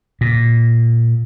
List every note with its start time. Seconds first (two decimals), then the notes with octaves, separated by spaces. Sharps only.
0.21 A#2